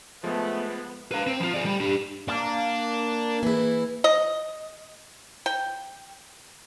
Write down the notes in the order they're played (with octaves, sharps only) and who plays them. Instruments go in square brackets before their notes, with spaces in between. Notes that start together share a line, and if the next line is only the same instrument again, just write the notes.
[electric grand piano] F3 G#3 [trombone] A3 [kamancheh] B3
[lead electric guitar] B4 F5
C4
F3 F4
G#4 D5
G3
D4 G4
[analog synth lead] A#3 [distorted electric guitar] D4
[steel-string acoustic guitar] E3 E4 [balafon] A#3 G#4
[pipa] D#5
G5